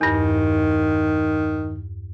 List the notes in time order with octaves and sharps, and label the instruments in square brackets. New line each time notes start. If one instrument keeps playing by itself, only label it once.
[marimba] E2 G2 [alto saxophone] D#3